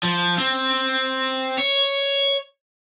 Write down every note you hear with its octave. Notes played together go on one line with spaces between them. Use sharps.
F3
C4
C#5